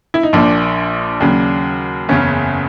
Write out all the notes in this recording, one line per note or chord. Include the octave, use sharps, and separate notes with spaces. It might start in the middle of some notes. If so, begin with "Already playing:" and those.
E4
D#4
A#1 A#2 F3 D4
D#2 C#3 F#3
F#1 E2 C#3 C#4